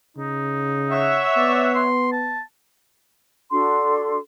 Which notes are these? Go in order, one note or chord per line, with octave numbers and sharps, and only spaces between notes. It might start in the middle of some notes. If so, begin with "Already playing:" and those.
C#3 D#4
C#5 E5 F#5
B3 D5
C6
A5
D4 F#4 A4 C6